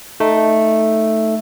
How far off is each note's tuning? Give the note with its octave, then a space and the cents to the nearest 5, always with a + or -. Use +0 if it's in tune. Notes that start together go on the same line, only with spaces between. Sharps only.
A3 +0 D#4 +0